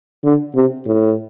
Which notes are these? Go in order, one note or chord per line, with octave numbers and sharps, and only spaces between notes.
D3
C3
A2